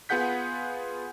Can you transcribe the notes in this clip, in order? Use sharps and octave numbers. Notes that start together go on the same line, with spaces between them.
B3 F4 G#4 F#5 G6 B6